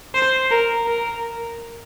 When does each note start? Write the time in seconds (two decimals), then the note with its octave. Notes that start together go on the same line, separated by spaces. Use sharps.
0.15 C5
0.51 A#4
0.87 A#4